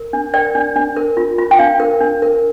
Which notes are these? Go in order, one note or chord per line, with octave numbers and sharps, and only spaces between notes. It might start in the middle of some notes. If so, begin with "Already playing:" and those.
Already playing: A#4
D4
A#4 D5 G5
D4
D4
A#4
F4
F4
G5
D4 F5
A#4
D4
A#4